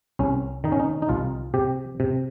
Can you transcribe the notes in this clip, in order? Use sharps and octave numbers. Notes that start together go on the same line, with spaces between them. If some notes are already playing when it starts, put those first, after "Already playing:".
C2 C#4
D#3 D#4
C#4
D#4
D#4
C2 F4
C3 G4
C3